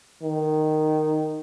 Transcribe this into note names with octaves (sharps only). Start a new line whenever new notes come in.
D#3